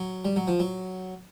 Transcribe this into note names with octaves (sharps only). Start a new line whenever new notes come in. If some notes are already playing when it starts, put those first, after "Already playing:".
Already playing: F#3
G3
F#3
F3
F#3